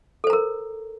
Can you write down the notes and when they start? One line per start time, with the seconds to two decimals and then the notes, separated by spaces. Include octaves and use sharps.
0.24 A4
0.27 C5
0.30 A#5
0.33 A#4